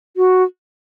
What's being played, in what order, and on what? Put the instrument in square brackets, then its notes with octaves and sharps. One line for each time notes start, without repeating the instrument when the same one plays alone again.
[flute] F#4